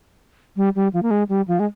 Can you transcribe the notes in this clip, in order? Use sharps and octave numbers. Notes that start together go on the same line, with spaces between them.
G3
G3
F3
A#3
G#3
G3
F3
G#3